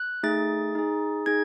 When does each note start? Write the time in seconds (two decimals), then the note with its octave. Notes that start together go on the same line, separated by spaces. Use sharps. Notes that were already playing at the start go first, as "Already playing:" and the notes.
Already playing: F#6
0.23 A3 D#4 G#4 A6
0.75 D#4 G#4
1.26 D#4 G#4 G#6